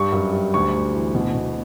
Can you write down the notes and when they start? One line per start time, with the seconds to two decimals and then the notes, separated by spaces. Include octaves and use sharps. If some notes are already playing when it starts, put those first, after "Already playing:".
Already playing: G2 G3 C#6
0.12 F#2
0.33 G3
0.54 D2 C#6
0.74 D2
0.94 E3
1.15 B2
1.34 B2